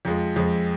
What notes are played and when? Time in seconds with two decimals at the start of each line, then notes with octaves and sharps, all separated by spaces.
0.05 F2 F3 G#3
0.36 F2 F3 G#3